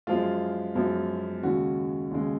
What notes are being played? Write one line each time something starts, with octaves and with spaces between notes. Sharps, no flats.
F#2 F3 G#3 F4
F#2 F3 G#3
D#2 C#3 G#3 F#4
D#2 C#3 G#3